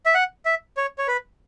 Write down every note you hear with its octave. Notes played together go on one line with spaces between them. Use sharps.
E5
F#5
E5
C#5
C#5
B4